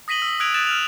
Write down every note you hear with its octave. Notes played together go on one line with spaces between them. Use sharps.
D#6 A#6 B6 D#7 F#7 G7
E6
D#6 E6 F#6 G#6 D7 F7
F#6 A6 E7
F6 F#6 F7